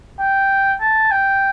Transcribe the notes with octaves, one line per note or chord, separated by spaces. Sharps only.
G5
A5
G5